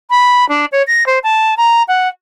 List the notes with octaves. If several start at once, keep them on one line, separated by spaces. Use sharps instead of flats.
B5
D4
C#5
A#6
C5
A5
A#5
F#5